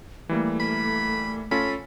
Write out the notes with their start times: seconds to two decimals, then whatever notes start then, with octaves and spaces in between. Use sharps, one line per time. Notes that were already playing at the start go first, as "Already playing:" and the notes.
0.29 E3 G3 A3 A#3
0.60 B5
1.51 C#4 F4 A4 B5